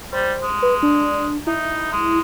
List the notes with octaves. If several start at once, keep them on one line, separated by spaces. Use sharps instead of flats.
G3 C5
G#3
B4
D4
D#4 E4
G#3